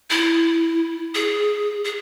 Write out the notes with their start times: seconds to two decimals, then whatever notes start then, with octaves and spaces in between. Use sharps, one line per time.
0.10 E4
1.15 G#4
1.84 G#4